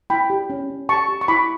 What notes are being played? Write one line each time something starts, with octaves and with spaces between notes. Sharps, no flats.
E4 G5 B5
G4
C#4
C#4
G4 A5 C#6
G4
C#6
E4 B5 D6